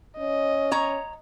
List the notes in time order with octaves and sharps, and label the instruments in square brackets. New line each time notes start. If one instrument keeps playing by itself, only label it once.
[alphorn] C#4 [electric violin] D#5
[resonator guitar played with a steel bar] C#5 A#5